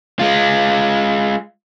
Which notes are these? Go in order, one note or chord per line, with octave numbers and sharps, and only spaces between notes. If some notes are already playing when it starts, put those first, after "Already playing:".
G#3 F4